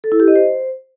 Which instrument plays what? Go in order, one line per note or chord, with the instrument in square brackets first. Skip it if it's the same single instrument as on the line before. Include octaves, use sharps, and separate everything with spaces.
[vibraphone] A4
E4
G4
D#5
C5